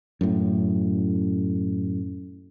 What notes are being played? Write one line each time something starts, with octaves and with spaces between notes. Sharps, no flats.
F#2 A2